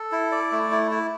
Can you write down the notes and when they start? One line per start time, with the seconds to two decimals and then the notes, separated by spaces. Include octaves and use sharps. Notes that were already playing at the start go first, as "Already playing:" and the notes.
Already playing: A4
0.12 E4
0.32 D5
0.52 A3
0.71 E4
0.91 E4